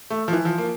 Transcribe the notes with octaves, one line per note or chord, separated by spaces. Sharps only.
A3
F3
E3
F3
A#3